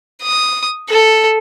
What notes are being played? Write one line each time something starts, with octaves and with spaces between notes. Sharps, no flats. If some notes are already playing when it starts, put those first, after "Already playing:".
D#6
A4